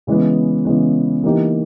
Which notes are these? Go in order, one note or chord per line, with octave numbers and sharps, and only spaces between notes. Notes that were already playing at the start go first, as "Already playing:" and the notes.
C#3 E3 G#3 B3
C#3 E3 G#3 B3
E3 A#3 D#4 G4